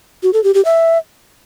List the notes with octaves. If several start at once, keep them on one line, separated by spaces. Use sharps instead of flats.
F#4
A4
G4
G4
E5